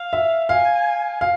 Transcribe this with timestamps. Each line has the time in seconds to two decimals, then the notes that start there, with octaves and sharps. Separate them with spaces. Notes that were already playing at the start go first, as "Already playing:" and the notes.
Already playing: F5
0.13 E5
0.49 F5 G#5
1.21 F5